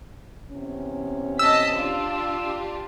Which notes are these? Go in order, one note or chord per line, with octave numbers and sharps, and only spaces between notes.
E2 C3 C#4
D#5 A5 E6 B6
D4 F4 G4